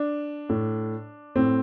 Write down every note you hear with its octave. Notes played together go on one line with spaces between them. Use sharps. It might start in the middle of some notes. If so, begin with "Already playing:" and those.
Already playing: D4
A2
A2 C4